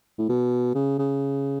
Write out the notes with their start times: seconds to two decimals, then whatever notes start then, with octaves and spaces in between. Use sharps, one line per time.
0.18 A2
0.29 B2
0.75 C#3
0.99 C#3